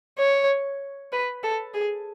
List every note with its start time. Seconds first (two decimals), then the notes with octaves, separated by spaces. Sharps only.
0.18 C#5
1.12 B4
1.43 A4
1.74 G#4